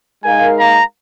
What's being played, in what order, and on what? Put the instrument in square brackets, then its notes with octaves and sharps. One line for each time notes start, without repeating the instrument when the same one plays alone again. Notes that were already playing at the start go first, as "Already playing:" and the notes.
[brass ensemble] G#3 D#4 A#4 F5 [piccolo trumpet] G#5
[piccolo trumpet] A#5